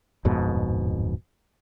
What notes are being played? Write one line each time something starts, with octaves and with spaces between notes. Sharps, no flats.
D1 F2 G#2 B2